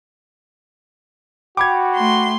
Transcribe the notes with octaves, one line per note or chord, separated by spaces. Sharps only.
F#4 G5 B5 D6 G#6
A3 C6